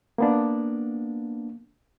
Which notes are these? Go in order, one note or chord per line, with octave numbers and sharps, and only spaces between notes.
A#3 B3 D4